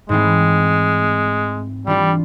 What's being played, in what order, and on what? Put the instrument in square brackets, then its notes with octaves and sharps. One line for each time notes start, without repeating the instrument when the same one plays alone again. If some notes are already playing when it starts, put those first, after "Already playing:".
[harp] G#2 E3 A3 C4 [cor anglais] G#3
[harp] E3 A3 D4 F4 [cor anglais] G3